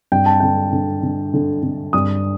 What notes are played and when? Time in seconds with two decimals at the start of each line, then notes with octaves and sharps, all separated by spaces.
0.12 G2 G5
0.26 A5
0.40 D3 G5
0.72 D3
1.03 D3
1.34 D3
1.63 D3
1.93 G2 D#6